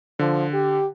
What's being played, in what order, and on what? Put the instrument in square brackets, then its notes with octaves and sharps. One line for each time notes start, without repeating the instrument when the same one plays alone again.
[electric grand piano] D3 [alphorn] F3
[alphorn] G4